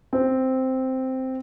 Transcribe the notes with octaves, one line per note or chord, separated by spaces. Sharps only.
C4